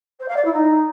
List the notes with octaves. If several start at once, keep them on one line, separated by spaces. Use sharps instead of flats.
C5
F5
D5
E4
D#4